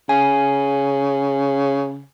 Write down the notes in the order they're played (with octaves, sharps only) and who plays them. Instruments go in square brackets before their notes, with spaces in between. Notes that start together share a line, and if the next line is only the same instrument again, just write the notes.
[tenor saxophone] C#3 [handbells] G#5